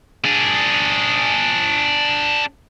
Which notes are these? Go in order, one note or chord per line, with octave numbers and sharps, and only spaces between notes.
D4 G#4